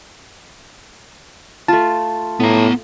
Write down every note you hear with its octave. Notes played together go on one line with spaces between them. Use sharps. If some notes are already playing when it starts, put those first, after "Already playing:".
A3 F4 A5
A2 B3 A#5